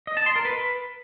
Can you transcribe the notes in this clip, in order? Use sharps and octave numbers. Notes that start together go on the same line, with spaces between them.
D#5
A5
C6
A#4
B4